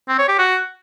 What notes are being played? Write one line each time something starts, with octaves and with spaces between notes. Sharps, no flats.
C4
C#5
G4
F#4